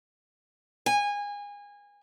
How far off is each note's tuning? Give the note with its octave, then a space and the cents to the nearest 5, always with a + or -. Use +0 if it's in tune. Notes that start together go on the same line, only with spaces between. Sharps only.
G#5 -25